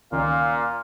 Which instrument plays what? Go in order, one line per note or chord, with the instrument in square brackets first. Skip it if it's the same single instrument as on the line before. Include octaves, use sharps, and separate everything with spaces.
[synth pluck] C#2 D#3 C#4 [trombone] A#2 [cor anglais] F5